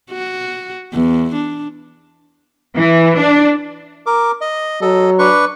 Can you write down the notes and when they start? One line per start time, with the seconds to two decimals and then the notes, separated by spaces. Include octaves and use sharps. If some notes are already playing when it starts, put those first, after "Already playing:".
0.11 F#4
0.94 E2
1.35 D4
2.77 E3
3.19 D4
4.06 A#4 D6
4.41 D#5
4.82 F#3 A4 D#5
5.19 D4 B4 C#6